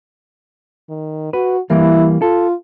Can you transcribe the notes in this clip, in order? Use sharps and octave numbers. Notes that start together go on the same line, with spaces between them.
D#3
F#4 B4
E3 G3 A#3 E4
F4 A4